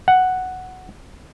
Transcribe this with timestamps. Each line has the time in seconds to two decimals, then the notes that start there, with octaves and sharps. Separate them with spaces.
0.08 F#5